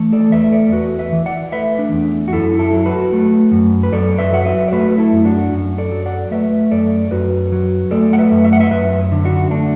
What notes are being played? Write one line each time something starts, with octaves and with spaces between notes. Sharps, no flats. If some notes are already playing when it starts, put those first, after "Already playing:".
Already playing: E3 A3
A4 D5
E2 B4 E5
A4 D5
E2 F#4 B4
B4 E5
E3
D5 F#5
A3 B4 E5
D4
E2
F#4
F#2 E4 A4
E4 A4
F#3
F#4 B4
A3
F#2
B4
F#2 A4 D5
B4 E5
F#3 F#5
B4 E5
D5
A3 F#4 B4
E4 A4
F#2
D4 F#4
F#2
A4 D5
F#3
D5 F#5
A3 B4 E5
F#2 A4 D5
F#2 F#4 B4
F#3
A3 A4 D5
F#5
B4 E5
F#2
E5
F#5
B4 E5
F#2 B4 E5
D3
D4 F#4
A3 D4